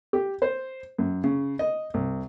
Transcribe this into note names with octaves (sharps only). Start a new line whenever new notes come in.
G4
C5
F#2
C#3
D#5
C2